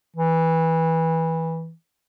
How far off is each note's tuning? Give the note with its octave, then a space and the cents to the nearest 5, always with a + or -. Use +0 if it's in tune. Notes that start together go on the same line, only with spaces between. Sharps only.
E3 -15